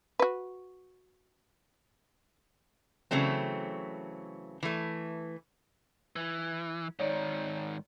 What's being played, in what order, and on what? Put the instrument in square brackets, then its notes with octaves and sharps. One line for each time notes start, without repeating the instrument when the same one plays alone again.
[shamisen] F#4 B4
[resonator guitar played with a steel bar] C#3 E3 F#3 A3 C4
E3 A3
[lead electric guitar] E3 [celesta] G#6
[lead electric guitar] G#2 D#3 [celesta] C#5 D5